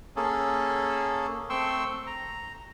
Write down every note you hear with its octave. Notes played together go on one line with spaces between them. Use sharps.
A#3 C#4 G#4 A4
A3 C4 G5 C6 C#6 E6
A#5